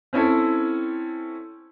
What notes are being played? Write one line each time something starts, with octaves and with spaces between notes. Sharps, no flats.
C4 C#4 E4 A4